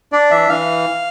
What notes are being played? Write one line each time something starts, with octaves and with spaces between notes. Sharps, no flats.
D4 D5
E3 E5
E3 F5